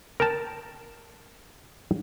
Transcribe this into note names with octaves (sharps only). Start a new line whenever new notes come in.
A#4 G5 A5